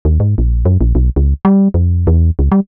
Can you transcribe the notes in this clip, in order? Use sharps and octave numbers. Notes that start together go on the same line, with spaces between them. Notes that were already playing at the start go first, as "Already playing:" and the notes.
D#2
G#2
A#1
F#2
A#1
B1
C#2
G3
F2
E2
C#2
G3